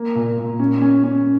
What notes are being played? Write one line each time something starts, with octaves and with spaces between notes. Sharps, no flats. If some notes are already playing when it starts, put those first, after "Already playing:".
Already playing: A#3
A#2
A#2
C#4
C#4
C#4